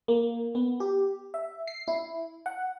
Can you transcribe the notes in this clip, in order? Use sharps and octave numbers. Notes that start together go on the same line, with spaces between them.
A#3
B3
G4
E5
C7
E4
F#5